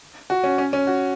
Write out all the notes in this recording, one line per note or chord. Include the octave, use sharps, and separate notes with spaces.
F#4
C#4
C#4
C#4
F#4